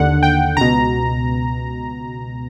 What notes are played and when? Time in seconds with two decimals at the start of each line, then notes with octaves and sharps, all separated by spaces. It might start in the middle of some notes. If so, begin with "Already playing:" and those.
Already playing: D#2 D3 F#5
0.23 G5
0.57 C#2 B2 A#5